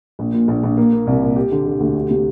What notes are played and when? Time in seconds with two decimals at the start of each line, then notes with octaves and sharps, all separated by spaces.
0.19 A#1
0.34 A#2
0.48 A#1
0.63 A#1
0.77 A#3
0.92 A#3
1.07 C2
1.22 A#2
1.36 G4
1.52 D3
1.66 D3
1.80 D2
1.95 G4
2.10 C3